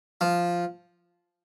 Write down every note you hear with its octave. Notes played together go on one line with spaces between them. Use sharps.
F3